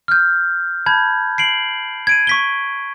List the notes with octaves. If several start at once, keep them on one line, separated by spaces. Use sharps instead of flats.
F6 G6
A5 B5 G6 G#6
C7 D7 F#7
G#6 D7 D#7
C#6 B6 G7